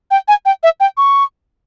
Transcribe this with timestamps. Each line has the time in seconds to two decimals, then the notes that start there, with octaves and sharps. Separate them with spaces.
0.11 G5
0.28 G#5
0.46 G5
0.63 E5
0.80 G5
0.97 C#6